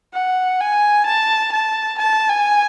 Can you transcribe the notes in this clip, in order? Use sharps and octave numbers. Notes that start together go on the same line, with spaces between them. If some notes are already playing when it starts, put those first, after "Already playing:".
F#5
G#5
A5
A5
A5
G#5